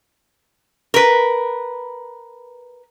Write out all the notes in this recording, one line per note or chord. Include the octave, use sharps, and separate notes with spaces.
A#4 B4